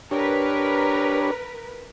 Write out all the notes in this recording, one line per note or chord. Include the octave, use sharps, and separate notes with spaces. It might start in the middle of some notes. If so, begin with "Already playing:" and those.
D4 G4 A#4 B4 C#5